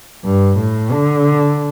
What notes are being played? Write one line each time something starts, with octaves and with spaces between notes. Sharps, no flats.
G2
A2
D3